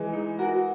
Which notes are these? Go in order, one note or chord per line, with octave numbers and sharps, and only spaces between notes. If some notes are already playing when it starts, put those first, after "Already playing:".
Already playing: E3 G#3
D#4
F#4 A#4